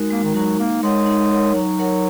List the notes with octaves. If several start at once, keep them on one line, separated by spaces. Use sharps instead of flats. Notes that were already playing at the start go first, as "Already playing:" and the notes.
Already playing: G#3 D#4 F#4 A#4
G#3 A#3
D#3
F#3 D#4 F#4 A#4
A#3 D#4
G#3 A#4 C#5 F#5
D#4
A#4 C#5 F#5
F#3 D#4
A#4 C#5 F#5